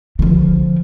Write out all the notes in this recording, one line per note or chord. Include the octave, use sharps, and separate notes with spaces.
D3 F3